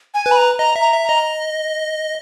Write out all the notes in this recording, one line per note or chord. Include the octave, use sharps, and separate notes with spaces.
G#5
B4
B5
A#5
D#5 A#5
E5
A#5
E5
A#5
D#5